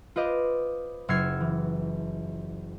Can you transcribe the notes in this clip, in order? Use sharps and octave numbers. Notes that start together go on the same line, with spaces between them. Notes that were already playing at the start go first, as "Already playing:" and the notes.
F4 B4 C5 D#5 F5 D6
F#1 C#6 E6 F6 G#6 C7
E3